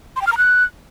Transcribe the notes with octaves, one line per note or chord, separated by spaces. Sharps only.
C6
G5
F6
A#5
F#6